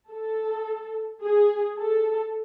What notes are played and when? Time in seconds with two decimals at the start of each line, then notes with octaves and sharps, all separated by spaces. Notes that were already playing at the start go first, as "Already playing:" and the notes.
0.11 A4
1.23 G#4
1.78 A4